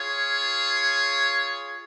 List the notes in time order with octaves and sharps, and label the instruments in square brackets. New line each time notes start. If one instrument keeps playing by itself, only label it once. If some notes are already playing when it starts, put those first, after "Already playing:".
Already playing: [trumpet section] F4 G#4 C#5 F5